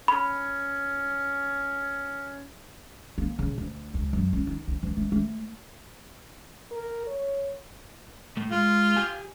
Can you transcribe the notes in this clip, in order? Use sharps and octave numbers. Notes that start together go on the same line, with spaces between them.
C#4 B5
A#3
C#3
D2
C#2
F#2
C#4
D#4
D2
E3
A3
A3
A#4
C#5
A2 A3
G#3 F4
G4 G#5